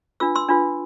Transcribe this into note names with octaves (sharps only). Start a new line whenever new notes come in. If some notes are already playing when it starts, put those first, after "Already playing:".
D4 F4 B4 E6
C6 E6
D4 F4 B4